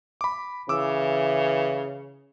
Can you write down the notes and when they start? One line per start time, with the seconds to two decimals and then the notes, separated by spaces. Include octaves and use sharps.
0.21 B5 D6
0.69 C#3 E3 D6 E6